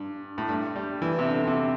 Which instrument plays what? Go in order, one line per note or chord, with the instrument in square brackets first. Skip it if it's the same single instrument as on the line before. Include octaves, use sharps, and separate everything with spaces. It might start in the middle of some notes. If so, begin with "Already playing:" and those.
Already playing: [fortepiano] G2
A2
G2
G3
E3
C3
D3
D3
C3